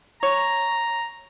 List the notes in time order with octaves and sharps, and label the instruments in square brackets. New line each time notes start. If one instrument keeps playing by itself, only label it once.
[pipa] C#5 [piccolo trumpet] A#5